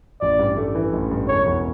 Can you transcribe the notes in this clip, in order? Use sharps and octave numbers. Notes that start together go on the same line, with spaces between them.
A1 D5
G2
A3
E3
A1
G2
E1 C#5
E2